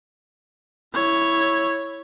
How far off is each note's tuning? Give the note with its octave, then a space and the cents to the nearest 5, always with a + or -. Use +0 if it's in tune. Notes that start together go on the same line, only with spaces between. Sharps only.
E4 +0 C#5 +0